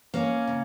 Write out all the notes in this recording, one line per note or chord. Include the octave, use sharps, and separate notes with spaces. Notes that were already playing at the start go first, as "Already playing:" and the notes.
A#3 C#4
C#3